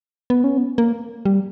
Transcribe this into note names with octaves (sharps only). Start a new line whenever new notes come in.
B3
C#4
B3
A#3
G3